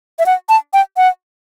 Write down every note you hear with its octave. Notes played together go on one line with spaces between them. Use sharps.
E5
F#5
A5
G5
F#5